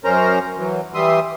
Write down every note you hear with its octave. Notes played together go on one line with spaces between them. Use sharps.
F#2 C#4 A#4 C5 A#5
E3 F#3
E3 G3 E5 C6 D#6